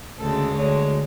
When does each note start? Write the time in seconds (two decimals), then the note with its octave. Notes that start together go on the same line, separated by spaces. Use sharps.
0.19 D2 C#3 G#3 A4
0.54 D2 D3 G#3 C#5